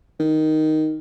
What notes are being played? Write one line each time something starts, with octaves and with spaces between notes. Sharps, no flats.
D#3